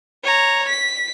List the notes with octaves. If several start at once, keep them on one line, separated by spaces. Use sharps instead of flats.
C#5 A#5
B6